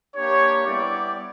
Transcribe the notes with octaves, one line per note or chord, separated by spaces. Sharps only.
A#3 D4 G4 C#5
G3 B3 E4 G4 D5